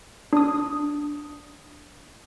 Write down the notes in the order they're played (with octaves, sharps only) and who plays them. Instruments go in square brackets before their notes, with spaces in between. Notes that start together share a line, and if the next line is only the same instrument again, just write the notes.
[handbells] D4 D#6